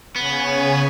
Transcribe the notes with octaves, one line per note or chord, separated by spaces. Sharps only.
C#3 B3 C#5 G#5